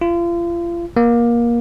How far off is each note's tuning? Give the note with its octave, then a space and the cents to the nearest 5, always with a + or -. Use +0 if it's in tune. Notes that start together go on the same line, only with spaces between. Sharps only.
F4 -35
A#3 +20